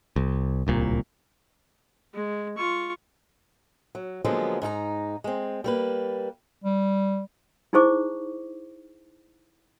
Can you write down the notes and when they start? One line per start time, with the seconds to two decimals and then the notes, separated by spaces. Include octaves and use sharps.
0.16 C2
0.67 D1 C2 A#2
2.14 G#3
2.57 F4 C#6
3.95 F#3
4.24 D3 F3 F#3 G#3 A#3 B3
4.62 G#2 D#4 A4 A#5
5.24 G#3 C4
5.64 G3 A#3 B4
6.64 G3
7.73 D#4 E4 G#4 C5 C#6 D6